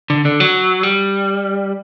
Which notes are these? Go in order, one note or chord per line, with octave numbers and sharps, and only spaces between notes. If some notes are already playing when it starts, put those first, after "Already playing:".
D3
D3
F#3
G3